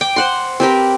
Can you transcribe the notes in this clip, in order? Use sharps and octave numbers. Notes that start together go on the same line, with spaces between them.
G5 D6
C5 F#5 C6
C4 G4 A#4 B4